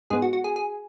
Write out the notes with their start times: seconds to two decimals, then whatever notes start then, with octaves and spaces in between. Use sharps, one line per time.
0.10 G#2 G#3 B3 G#4
0.22 F#4
0.33 F#4
0.44 G#4
0.56 G#4